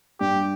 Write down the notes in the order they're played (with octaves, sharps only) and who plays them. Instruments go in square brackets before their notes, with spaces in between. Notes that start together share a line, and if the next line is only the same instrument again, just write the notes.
[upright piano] G2 [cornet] G4